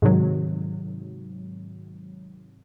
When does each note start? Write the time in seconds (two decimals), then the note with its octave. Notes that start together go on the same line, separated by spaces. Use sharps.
0.02 G#2 C3 D#3 F#3